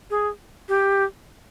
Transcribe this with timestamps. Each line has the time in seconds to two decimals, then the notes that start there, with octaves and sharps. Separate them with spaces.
0.10 G#4
0.69 G4